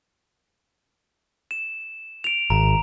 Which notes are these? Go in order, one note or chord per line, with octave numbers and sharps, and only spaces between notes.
E7
D7 F7
G#1 A#5